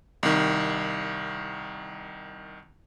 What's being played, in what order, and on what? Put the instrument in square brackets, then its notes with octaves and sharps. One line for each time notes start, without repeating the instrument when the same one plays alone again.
[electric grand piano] C2 D#3